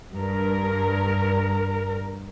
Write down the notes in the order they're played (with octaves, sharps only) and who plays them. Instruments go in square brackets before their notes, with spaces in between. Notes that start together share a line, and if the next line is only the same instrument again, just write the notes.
[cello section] G2 A#4